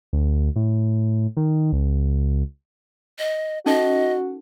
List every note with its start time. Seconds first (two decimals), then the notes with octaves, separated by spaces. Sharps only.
0.13 D2
0.56 A2
1.37 D#3
1.73 C#2
3.19 D#5
3.66 C#4 D#4 F#4 A4 D#5